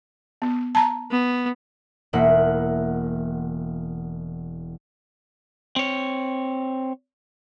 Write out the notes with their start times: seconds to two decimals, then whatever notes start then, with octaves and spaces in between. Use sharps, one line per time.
0.42 B3
0.75 A5 A#5
1.11 B3
2.13 E1 A#3 E4 F#5
5.76 C4 C#5